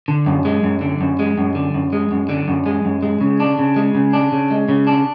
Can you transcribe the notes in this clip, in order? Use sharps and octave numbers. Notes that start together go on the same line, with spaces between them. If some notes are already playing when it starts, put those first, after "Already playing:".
D3
F#2
G#3
F#2
D3
F#2
G#3
F#2
D3
F#2
G#3
F#2
D3
F#2
G#3
F#2
G#3
C#3
D4
C#3
G#3
C#3
D4
C#3
G#3
C#3
D4